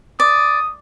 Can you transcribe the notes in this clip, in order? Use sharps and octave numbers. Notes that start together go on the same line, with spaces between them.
D5 D#6